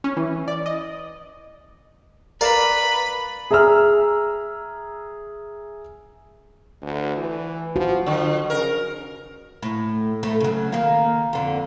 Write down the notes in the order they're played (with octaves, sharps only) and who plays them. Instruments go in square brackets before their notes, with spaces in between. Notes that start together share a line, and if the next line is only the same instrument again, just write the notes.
[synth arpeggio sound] C#4
E3
D5
D#5
[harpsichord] A#4 D5 F5 [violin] B4 B5
[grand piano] G#4 E5 A#5 E6 F6
[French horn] D2
E3
[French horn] F3 [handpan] F#4
[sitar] D3 [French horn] F3
[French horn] C#3 [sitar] A#4
[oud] A2
A2 A3
C#3 F#3
D#3 A#3
F2 D3